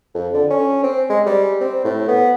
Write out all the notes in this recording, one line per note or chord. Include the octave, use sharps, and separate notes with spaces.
F2
D3
C#4
C4
G#3
G3
C4
A2
B3